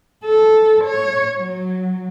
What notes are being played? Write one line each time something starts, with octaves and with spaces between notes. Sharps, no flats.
A4
C#5
F#3